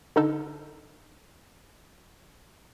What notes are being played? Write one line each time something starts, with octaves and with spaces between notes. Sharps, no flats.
D3 D#4 A4